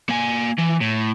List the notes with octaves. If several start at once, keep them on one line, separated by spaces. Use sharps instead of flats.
A#3 G#5
E3
A2